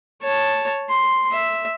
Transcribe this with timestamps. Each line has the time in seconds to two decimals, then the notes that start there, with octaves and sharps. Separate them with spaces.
0.22 C#5 A5
0.89 C6
1.32 E5